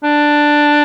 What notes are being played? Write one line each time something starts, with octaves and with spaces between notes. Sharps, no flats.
D4